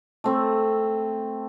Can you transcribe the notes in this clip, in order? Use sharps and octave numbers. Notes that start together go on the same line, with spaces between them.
A3 C4